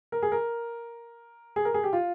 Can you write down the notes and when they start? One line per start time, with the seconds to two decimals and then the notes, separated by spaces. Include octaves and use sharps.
0.12 A#4
0.22 G#4
0.32 A#4
1.56 G#4
1.65 A#4
1.74 G#4
1.84 G4
1.93 F4